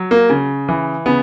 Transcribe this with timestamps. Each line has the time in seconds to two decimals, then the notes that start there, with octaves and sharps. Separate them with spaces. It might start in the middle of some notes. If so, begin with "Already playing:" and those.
Already playing: F#3
0.11 A#3
0.30 C#3
0.69 E3
1.06 C#3 B3